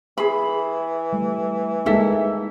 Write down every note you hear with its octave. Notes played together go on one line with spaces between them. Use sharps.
E3 G#4 B5
G3 A3 E5
G#3 A#3 D#4 E4 A4 E5